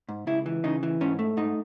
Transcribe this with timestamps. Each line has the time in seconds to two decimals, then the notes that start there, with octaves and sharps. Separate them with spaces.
0.09 G#2
0.27 C#2 E4
0.46 E3
0.64 C#3 D#4
0.83 E3
1.01 G#2 C#4
1.19 A3
1.37 G#2 D#4